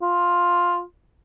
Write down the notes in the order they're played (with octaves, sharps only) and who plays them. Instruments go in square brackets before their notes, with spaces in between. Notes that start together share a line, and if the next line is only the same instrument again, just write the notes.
[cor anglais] F4